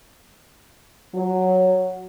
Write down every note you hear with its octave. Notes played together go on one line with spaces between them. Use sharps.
F#3